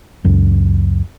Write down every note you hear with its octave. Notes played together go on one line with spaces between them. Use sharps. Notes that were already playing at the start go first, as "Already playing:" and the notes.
C#2 F#2